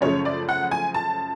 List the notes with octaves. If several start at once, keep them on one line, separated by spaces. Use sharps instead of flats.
F#2 C#3 F3 A3 C#5
D5
F#5
G#5
A5